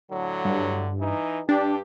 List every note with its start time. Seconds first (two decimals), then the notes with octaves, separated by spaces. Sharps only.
0.12 A2 D3 F#3
0.45 G2
1.00 E3 D#4
1.49 G2 D4 G4